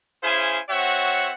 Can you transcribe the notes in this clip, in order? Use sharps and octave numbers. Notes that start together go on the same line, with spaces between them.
C#4 E4 G#4 C5 F5 G#5
C4 F#4 C#5 E5 F#5